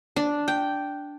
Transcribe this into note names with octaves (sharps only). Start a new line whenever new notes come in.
D4
G5